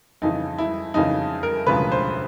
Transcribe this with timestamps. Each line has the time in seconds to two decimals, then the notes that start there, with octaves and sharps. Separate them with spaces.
0.22 F2 C#3 E3 D#4
0.58 E4
0.94 F2 C#3 E3 D#4
1.43 A#4
1.67 E1 D2 C#3 F3 B4
1.92 C5